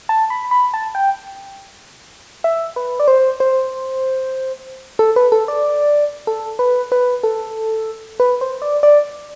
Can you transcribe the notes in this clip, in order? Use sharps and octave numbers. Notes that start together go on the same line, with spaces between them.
A5
B5
B5
A5
G5
E5
B4
D5
C5
C5
A4
B4
A4
D5
A4
B4
B4
A4
B4
C5
D5
D5